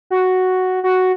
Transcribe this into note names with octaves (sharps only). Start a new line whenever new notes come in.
F#4
F#4